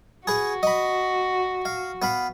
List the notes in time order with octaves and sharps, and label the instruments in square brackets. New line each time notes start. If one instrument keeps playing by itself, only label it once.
[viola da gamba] F#4 [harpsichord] G#4 B4
[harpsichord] D#5 B5
F5
B3 F5 B5